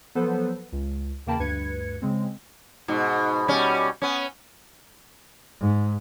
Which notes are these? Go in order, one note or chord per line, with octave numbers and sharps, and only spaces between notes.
F3 F#3 B3 A4 B4 C5
C#2
E2 C#3 A#3 G5 A5 B5
D2 G2 B4 G#6 C#7
C#3 G#3 C4
G#2 B2
B2 G3 C#4
B3 C#4
G#2